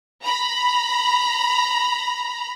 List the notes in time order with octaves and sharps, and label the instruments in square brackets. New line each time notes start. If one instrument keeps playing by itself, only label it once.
[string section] A#5 B5